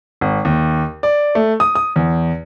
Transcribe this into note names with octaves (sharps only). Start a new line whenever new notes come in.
G#1
D#2
D5
A3
D#6
D#6
E2